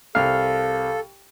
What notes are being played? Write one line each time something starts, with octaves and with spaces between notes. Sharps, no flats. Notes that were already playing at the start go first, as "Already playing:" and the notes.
C2 A4 F5 F6